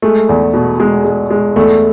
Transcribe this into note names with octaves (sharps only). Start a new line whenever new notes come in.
G#3 A3
E2
B2
B2 G#3
G#3
G#3
E2 A3